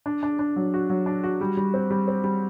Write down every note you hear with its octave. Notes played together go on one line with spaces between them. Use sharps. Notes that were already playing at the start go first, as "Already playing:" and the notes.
D4
D4
D4
F#3
F#4
F#3
D4
F#4
G3
G3
C4
G3
C4
G3